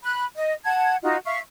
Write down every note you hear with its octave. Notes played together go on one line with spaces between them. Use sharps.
B5 F#6
D#5
F#5 A5 G#6
D#4 F4 F#4
E5 F5 C#6